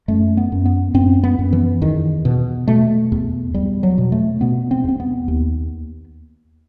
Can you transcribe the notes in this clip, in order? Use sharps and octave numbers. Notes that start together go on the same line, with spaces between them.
F#2 A3
B3
F#2
B3
F#2 C4
B3
F#2
E3
E2 D#3
B2
B2 A3
E2
E2 G3
F#3
B2
A3
B2 B3
C4
E2 C4
B3
D#2